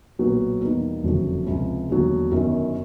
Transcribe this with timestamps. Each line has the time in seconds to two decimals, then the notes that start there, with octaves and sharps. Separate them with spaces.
0.19 B1 A#2 F#3 B3
0.61 E2 B2 G3 A#3 D#4
1.03 F#1 F2 D3 F#3
1.46 C#2 C3 F3
1.88 E1 D#2 D3 F#3
2.31 G1 F#2 D#3